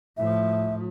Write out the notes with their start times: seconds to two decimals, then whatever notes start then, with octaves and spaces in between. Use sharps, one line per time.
0.17 A2 F3 E5